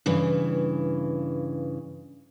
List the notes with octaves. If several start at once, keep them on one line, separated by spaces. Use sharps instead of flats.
G2 C#3 E3